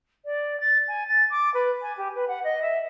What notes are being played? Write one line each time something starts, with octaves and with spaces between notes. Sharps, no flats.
D5
A6
G#5
A6
D6
B4
G#5
G4
B4
F#5
D#5
E5